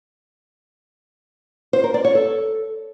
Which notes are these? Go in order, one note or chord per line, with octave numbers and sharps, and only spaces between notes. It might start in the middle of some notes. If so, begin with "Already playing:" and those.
C5
A#4
D5
C#5
A4